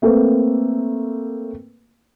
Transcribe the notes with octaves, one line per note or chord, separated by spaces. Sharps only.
A3 A#3 C4 B4